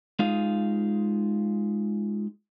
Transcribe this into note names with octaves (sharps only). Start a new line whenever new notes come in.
G#3 D#4 F4 G#4 F5